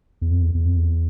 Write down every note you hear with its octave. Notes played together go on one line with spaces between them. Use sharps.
E2
F2
E2
E2
F2
E2